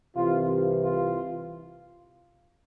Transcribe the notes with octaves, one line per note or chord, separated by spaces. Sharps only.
C2 C3 E3 F4
F4